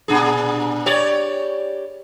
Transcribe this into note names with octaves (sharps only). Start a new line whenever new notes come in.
A#2 D4 G#4
G4 C#5 D5